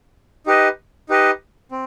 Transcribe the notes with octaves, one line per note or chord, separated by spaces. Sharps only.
D#4 G4 B4 D#5
D#4 G4 B4 D#5
C4